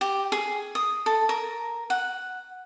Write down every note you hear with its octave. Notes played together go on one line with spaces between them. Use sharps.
G4
G#4
D#6
A4
A#4
F#5